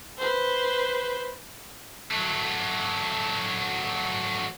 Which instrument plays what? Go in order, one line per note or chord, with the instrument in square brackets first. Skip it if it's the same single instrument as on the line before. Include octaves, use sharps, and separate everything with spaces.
[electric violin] B4 C5
[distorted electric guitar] F#3 A3